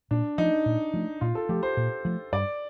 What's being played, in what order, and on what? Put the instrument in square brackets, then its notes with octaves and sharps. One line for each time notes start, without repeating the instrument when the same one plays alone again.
[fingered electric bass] A#2 [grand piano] D4
[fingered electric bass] F3 A3 [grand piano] D#4
[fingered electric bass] A#2
F3 A3
[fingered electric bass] A#2 [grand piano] F4
[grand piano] A4
[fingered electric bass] F3 A3 [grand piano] G4
[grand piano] C5
[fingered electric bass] A#2
F3 A3
[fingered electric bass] G2 [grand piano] D5